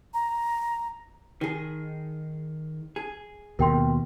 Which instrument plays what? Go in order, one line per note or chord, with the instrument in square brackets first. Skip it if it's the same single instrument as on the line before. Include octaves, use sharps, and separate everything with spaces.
[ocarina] A#5
[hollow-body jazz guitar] D#3 G#4
G#4
[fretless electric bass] D#2 B2 [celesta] A#4 G5 C6